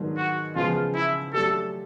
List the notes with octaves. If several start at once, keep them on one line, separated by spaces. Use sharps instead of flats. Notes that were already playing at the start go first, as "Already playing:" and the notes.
Already playing: G#2 D#3 F#3 B3 D4
F#4
C#3 F3 G#3 B3 F4
E4
F#3 A3 D4 G4 A4